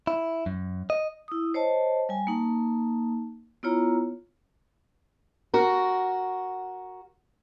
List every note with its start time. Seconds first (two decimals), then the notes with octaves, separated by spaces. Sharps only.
0.07 E4
0.46 F#2
0.90 D#5
1.28 E4 D#6
1.54 C5 C#5 D#5 A5
2.09 G3 G#5
2.27 A#3 D#4 A5
3.63 B3 E4 F4 C#5 A#5
5.54 F#4 A#4